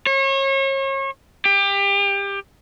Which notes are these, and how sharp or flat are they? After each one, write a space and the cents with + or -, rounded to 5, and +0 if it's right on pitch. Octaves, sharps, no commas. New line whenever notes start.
C#5 -35
G4 +25